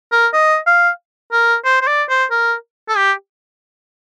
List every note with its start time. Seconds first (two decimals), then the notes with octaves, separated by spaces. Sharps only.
0.12 A#4
0.33 D#5
0.66 F5
1.32 A#4
1.65 C5
1.81 C5
1.88 D5
2.09 C5
2.31 A#4
2.89 A4
2.97 G4